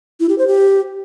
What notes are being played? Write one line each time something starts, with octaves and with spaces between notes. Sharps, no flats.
E4
G4
C5
G4